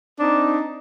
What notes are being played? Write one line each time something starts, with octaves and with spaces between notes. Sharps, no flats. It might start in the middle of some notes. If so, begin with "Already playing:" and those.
C4 D4 D#4